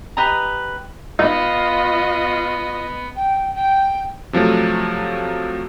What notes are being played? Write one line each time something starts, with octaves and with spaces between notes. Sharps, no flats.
G4 B4 D#5 A#5
B3 D#4 F4 D#5
G5
G5
C3 F3 F#3 A3